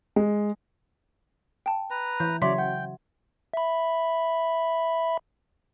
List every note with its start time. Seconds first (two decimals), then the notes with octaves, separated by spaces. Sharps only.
0.16 G#3
1.66 G5 A5
1.90 B4 A#5
2.20 E3 G6
2.42 C#3 F#3 C#5 D5 E5 C6 B6
2.58 F#5 G5
3.54 E5 B5